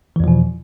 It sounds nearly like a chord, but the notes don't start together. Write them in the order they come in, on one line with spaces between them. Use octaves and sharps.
E3 E2 F3 B2